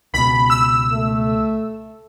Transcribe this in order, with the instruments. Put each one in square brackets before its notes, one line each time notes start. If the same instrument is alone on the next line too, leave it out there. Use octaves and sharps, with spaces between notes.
[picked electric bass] C#2 B2 [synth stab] B5
[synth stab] E6
[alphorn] A3